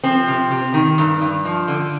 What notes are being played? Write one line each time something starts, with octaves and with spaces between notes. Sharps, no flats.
F3 C4
C3
C3
D#3
G2
G2
F3
D3